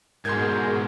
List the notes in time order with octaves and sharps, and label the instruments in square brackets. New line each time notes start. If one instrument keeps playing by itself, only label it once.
[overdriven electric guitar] G#2 B2 [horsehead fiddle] G#4 [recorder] A#4 [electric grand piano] C6 G6 G#6